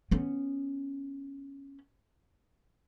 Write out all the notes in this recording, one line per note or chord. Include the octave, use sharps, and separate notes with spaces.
B3 C#4